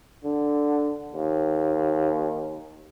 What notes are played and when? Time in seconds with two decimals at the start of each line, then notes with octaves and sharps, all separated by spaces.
0.25 D3
1.13 D#2